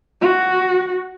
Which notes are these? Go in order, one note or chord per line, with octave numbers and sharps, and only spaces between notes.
F#4